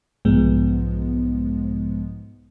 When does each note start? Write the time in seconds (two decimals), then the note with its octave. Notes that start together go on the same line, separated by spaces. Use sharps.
0.25 B1 G#2 F3 G#3 B3